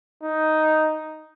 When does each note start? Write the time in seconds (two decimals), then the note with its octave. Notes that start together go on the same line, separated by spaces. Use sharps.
0.23 D#4